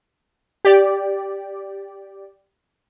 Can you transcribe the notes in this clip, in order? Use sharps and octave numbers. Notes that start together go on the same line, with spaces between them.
G4 D5